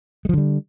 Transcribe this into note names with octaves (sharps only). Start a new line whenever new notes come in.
D3 F3 G3 G#3